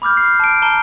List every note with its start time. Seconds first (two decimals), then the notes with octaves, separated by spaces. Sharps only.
0.02 B5 D6 F6 G6
0.17 C7
0.40 A5 D7
0.62 A5 A#5 G7